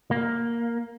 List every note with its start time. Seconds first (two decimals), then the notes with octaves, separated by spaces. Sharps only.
0.11 A#3